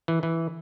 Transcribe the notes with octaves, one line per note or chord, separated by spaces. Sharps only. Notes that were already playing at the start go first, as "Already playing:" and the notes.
E3
E3